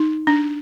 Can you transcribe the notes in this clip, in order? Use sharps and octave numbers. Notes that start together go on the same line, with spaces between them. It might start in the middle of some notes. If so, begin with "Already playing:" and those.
Already playing: D#4
D4